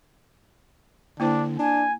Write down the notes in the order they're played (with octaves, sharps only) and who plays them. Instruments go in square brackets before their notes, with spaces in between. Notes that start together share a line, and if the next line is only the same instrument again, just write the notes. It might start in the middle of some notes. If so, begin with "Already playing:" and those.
[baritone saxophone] D3 [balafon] A#3 E4 C5 [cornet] D4
[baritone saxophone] D4 [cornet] G#5